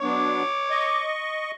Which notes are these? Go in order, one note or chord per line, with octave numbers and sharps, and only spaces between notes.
F#3 B3 D4 C#5 D6
D#5 C#6